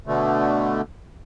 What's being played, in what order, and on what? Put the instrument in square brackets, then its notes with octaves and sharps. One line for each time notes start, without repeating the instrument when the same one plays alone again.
[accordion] B2 D3 A3